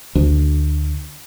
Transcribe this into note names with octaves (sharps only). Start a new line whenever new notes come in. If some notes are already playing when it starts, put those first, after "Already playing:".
D2